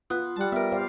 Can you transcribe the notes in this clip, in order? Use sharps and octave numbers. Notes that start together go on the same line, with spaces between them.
B3 F4 B4
G3 F#5 A5
B3 A#4 E5
C5 D5 F5